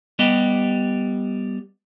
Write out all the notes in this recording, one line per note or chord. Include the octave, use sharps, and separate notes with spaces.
G3 B3 G4 D#5